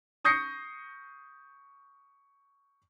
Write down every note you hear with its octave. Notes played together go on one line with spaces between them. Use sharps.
C#6 D#6 G6 A#6 C7 C#7